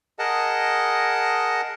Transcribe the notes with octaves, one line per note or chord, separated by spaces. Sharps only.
G#4 A#4 D#5 F#5 A5